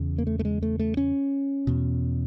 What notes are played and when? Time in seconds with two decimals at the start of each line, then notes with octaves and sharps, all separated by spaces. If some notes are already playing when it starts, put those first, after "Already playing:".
Already playing: E2 C#3
0.18 A#3
0.27 A3
0.39 A3
0.45 G#3
0.63 A3
0.79 A3
0.97 C#4
1.67 E2 B2